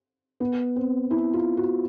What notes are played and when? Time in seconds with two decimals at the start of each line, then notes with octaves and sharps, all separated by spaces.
0.40 B3
0.76 C4
1.11 E4
1.33 F4
1.57 F#4